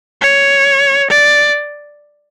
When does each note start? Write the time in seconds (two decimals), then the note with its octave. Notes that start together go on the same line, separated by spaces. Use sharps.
0.21 C#5
1.10 D5